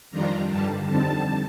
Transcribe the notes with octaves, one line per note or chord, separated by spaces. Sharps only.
F2 D#3 G3 D4 F4 A#5
G2 D3 G3 A5
F2 D3 G3 C4 D#4 A5